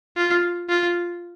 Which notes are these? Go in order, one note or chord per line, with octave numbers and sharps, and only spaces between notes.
F4
F4